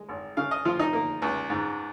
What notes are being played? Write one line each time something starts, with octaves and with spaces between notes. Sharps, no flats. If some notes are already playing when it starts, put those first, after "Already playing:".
Already playing: G#3
G#1
C#3 F5
D#5
F3 F4
D#4
A#3
C#2
G#2